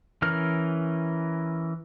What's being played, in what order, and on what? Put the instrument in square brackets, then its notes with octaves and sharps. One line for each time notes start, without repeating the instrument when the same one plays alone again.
[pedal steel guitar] E3 C#4 A#4 F6